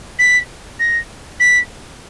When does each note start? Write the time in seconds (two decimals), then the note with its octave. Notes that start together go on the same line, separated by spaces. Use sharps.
0.19 B6
0.79 A#6
1.40 B6